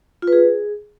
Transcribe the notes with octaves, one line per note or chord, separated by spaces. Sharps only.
F4
B4
G#4